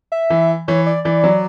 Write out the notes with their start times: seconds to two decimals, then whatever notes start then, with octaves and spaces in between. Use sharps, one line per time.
0.12 E5
0.30 E3
0.68 E3 C#5
0.86 D5
1.05 E3 D5
1.24 F#3